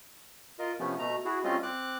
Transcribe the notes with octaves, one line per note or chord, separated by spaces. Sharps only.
F4 A#4 D#5
C3 F3 A3 B3 C#4
B2 A3 A#5
E4 F#4 G#4
G3 A3 C4 C#4 F4 D#5
C4 D6 F#6